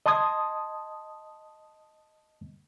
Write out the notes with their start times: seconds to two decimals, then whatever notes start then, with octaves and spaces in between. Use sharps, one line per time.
0.06 D#5 A5 C6 D#6 G#6